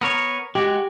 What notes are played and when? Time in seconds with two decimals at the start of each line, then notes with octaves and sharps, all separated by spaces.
0.01 B3 A#4 C#5
0.55 G#3 F#4 G4